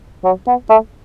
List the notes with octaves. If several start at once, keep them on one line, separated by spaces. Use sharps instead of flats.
F#3
B3
A3